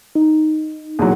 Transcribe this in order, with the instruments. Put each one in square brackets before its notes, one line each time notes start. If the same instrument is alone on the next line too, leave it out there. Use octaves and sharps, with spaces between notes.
[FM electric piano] D#4
[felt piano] E2 A#2 F#3